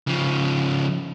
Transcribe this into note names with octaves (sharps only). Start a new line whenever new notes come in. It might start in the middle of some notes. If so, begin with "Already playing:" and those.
C#3 F3